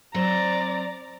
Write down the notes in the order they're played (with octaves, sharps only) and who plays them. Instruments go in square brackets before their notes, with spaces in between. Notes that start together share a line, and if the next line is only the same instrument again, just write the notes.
[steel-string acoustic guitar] F#3 C4 C5 [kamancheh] D5 A#5